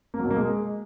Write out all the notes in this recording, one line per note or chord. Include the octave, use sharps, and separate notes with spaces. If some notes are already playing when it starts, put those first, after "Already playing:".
A#3
F#3
B2
A#3
G#3